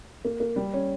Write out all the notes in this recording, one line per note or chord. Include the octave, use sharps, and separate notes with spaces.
A#3
A#3
G3
C#4